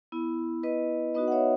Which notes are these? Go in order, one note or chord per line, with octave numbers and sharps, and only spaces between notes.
B3 E4
B4 D#5
B3 D#4 F#4 B4 D#5
F#5
C#5 E5